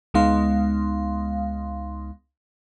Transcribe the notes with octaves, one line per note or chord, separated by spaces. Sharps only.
C#2 G#3 B3 D#4 F5 C6